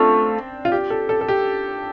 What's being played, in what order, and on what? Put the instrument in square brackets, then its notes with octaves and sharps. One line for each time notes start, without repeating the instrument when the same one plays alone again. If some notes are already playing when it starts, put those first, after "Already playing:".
Already playing: [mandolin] A3 F4 [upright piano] C4 D4
[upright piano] F4
G4
A4
A4
A4
G4